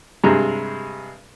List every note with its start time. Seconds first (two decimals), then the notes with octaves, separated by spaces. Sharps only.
0.24 G2 C3 G#3 A#5